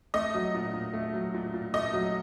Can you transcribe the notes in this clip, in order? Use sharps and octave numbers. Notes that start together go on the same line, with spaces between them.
A3 D#5
F#3
A#2
A#2
A3
F#3
A#2
A#2
A3 D#5
F#3